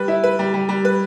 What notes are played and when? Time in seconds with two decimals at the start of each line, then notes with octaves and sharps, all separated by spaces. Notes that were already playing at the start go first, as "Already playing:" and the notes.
Already playing: G3 B4
0.08 E4
0.24 B4
0.39 G3
0.54 G3
0.69 G3
0.85 B4